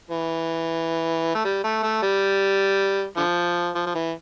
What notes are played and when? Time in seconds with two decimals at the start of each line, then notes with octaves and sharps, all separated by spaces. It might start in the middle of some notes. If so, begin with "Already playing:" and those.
0.11 E3
1.35 A3
1.45 G3
1.64 A3
1.83 A3
2.03 G3
3.17 D3 F3
3.75 F3
3.87 F3
3.95 E3